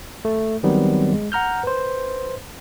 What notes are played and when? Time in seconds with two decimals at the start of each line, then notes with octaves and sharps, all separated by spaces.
0.25 A3
0.63 D#3 F#3 G3 B3 C4
1.13 G#3
1.32 F#5 A#5 F6 G6
1.63 B4 C5